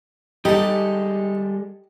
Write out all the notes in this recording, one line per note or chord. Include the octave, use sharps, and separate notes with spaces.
G3 G#3 D#4 G4 A4 A5